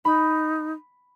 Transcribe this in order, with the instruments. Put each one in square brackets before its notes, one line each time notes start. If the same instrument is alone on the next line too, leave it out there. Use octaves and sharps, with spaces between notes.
[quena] D#4 [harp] B5